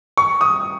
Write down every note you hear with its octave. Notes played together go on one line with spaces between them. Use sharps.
C#6
D#6